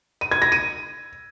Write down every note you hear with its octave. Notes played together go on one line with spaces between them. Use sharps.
D#7
G#6
A#6
D#7